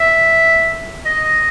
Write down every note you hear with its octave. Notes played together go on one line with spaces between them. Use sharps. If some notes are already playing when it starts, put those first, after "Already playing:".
Already playing: E5
D#5